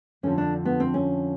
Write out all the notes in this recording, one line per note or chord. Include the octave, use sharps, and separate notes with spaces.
F2 D3 F3 C#4
D4
B3
C4
C#4